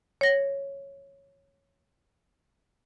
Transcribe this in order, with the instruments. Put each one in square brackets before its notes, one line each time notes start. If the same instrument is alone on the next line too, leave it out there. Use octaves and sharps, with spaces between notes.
[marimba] C#5 A#6